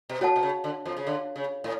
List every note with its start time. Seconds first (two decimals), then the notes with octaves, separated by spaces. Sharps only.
0.09 B2
0.21 A2 F#4 C#5 F#5 A5
0.36 B2
0.43 C#3
0.64 D3
0.86 F2 F3
0.97 C#3
1.07 D3
1.36 C#3
1.64 A2